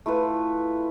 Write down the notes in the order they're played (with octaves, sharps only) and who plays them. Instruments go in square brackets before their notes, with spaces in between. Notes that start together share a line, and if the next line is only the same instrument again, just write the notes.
[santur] A3 E4 F4 B4